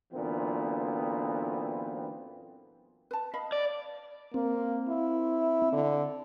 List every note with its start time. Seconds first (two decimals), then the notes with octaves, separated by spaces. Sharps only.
0.13 F#2 A#2 D3 E3 B3 C4
3.11 B4 A5
3.34 D#5 F5 B5
3.52 D5
4.34 A#3 C4
4.89 E4
5.73 D3